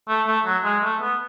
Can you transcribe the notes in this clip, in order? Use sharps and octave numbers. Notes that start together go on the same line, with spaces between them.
A3
A3
F#3
G#3
A3
B3